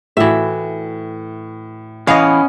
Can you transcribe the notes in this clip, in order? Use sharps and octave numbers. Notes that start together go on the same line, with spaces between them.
A2 E3 F#4 E5
E3 B3 C#4 D#5 F5